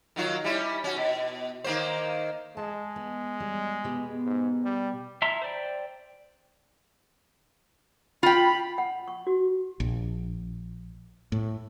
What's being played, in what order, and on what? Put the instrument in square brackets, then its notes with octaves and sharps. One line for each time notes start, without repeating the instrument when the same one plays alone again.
[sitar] D#3 F#3 F4
G3 C#4 E4
C#4 F#4
B2
D#3 A#3 C5
[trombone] G#3 [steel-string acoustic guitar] A5
[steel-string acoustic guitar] B3
G3
B2 B3 G4
[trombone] G#2
G3
[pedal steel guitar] E4 E5 A5 A#5 C6
C5 D5 G5
[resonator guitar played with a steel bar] F4 G5 [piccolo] B5
[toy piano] F#5
C#6
F#4
[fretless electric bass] A#1
A2